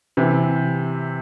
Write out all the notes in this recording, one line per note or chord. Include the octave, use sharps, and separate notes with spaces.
C3 E3